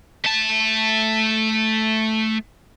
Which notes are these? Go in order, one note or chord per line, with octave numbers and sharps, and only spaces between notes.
A3 A5